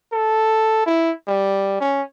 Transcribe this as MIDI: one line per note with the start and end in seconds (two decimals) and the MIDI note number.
0.12 0.85 69
0.86 1.11 64
1.28 1.76 55
1.81 2.02 61